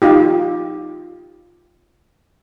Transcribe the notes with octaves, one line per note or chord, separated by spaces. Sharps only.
D#4 F4 G4